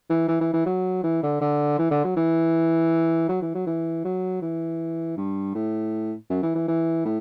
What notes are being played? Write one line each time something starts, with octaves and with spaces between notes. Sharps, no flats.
E3
E3
E3
E3
F#3
E3
D3
D3
E3
D3
F#3
E3
F#3
E3
F#3
E3
F#3
E3
G2
A2
F#2
E3
E3
E3
A2